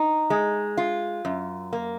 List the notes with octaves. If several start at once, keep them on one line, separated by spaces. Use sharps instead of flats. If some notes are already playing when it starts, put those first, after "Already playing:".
Already playing: D#4
G#3
F4
F#2
A#3